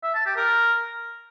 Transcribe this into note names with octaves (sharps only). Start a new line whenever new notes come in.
E5
A5
G4
A#4